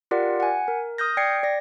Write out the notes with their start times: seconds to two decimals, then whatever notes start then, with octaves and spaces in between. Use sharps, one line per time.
0.11 F4 G4 A#4 D5 F#5
0.40 F#5 G#5
0.68 A#4
0.98 D#6 F6 G6 A#6
1.17 D5 G5 G#6 C7 C#7
1.43 D5 A#6